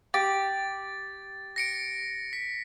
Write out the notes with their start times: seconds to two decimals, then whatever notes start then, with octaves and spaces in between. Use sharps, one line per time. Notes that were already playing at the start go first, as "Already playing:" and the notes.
0.14 G4 A6
1.56 A#6 C#7 D7
2.33 B6